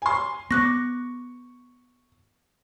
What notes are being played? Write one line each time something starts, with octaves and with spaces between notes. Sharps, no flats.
G#5 C6
B3 C#6 D6 F#6 A#6